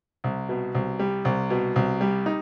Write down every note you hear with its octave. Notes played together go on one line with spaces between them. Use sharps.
C2
B2
C2
G3
C2
B2
C2
G3
D#4